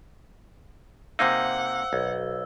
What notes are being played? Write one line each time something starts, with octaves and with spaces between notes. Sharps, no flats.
C3 A#3 D#4 C5 F5 F#5 E6
B1